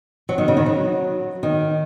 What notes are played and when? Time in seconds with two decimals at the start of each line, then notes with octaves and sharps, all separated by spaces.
0.29 F#3
0.38 D#3
0.48 C#3
0.57 D#3
0.66 F#3
1.43 D#3